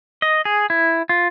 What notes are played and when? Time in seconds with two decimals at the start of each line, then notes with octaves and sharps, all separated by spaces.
0.22 D#5
0.45 G#4
0.70 E4
1.09 F4